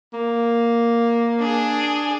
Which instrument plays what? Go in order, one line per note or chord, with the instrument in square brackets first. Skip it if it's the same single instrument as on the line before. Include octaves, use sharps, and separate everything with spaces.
[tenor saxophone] A#3
[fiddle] D4 G#4